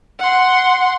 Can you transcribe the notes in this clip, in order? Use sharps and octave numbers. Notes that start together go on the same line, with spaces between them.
F#5 C6